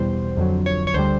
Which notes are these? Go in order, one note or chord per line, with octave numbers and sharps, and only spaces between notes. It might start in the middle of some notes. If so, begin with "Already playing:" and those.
Already playing: E2 B2 G3 C5
F2 D3 F#3
C#5
C#5
D2 D3 G3 C5